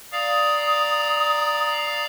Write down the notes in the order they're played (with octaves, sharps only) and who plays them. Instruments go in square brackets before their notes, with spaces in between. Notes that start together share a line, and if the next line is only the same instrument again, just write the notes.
[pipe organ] D5 F5 A#5 [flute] D#6